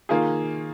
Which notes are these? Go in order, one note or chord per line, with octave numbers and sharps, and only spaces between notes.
D#3 A#3 F4 G#4